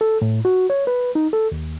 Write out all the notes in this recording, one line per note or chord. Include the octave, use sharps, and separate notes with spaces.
A4
A2
F#4
C#5
B4
D#4
A4
D#2